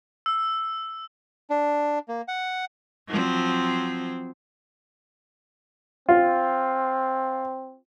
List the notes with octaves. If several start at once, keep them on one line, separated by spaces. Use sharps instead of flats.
E6
D4
A#3
F#5
F3 F#3 C4
C4 F4